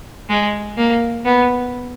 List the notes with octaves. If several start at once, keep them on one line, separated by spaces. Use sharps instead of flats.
G#3
A#3
B3